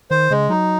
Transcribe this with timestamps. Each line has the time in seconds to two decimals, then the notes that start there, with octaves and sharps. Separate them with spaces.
0.11 D#3 C5
0.31 C#3 G#3
0.49 F#3 D#4